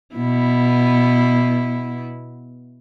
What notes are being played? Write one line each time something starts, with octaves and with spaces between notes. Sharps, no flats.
B2 B3 E4